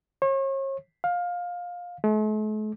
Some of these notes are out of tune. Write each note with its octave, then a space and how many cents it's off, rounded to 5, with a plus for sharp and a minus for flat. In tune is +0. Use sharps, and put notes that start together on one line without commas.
C#5 -40
F5 +20
A3 -45